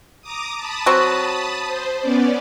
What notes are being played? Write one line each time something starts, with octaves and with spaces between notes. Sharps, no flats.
A#5 D6 D#6
A5 B5 D#6
F#3 C4 F#4
C5
B3 C#4 D5